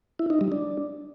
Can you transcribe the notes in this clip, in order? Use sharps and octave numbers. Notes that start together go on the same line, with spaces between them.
E4
D#4
G3
D4